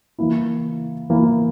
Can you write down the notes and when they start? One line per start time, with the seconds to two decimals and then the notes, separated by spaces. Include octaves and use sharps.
0.19 E3 A#3 E4
1.10 E3 A#3 E4